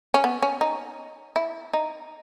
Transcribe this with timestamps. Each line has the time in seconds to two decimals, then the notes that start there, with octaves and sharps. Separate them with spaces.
0.14 C#4
0.24 B3
0.42 C#4
0.61 D#4
1.36 E4
1.73 D#4